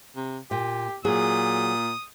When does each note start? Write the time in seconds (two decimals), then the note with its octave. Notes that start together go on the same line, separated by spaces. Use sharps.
0.16 C3
0.51 A#2 G4
1.05 A#2 F#3 G#4 D#6